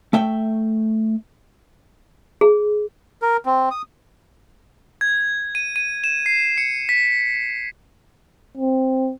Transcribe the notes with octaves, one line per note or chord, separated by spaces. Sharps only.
A3 E5 G5
G#4
A#4
C4
D#6
G#6
D#7
D#7
E7
C7
C#7
B6
C4